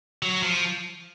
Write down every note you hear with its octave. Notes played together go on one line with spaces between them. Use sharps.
F#3
F3